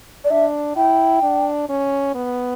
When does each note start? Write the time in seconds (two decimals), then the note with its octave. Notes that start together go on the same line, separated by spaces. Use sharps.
0.24 D5
0.30 D4 E5
0.76 E4 G5
1.23 D4
1.69 C#4
2.15 B3